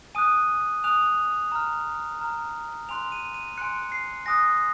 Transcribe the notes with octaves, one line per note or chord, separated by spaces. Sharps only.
G#5 D#6 F#6 D#7
G#5 D#6 F#6 F7
A#5 F6
A#5 F6
G#5 C6 F#6 F7
D#7
D#7
G#5 C6 F#6 C#7
C7
G#5 D#6 F#6 A#6